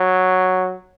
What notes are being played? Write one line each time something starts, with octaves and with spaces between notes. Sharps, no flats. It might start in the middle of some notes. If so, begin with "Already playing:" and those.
Already playing: F#3